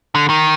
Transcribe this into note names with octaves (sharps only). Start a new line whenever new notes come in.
D3
D#3